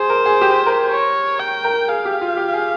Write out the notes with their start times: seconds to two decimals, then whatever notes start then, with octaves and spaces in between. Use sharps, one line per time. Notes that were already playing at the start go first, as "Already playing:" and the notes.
Already playing: G#4 C5
0.10 A#4
0.25 G#4
0.41 G4
0.66 A#4
0.91 C#5
1.39 G5
1.64 A#4
1.88 G#4 F5
2.05 G4
2.21 F4
2.37 G4
2.53 G#4